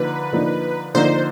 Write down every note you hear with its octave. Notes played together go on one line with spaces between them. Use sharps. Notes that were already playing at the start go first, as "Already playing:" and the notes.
Already playing: D3 F3 A#3 D#4 B4
D3 F3 A#3 D#4
D3 F3 A#3 D#4 C5